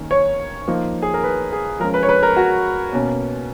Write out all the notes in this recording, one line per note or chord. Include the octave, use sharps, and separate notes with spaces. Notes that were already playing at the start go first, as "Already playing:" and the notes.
Already playing: D#3 A#3 C#4
C#5
F3 A#3 D#4
G#4
A#4
B4
G#4
F3 G#3 C#4 A#4
B4
C#5
B4
A#4
F#4
B2 A#3 C#4